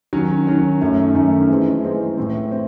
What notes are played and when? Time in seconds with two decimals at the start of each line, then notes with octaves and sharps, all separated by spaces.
0.13 D#3 F#3 C#4
0.47 D#3 F#3 C#4
0.81 F#2 D#3 A3 C#4
1.15 F#2 D#3 A3 C#4
1.49 E3 G#3 C4
1.84 E3 G#3 C4
2.17 A2 E3 C4
2.52 C4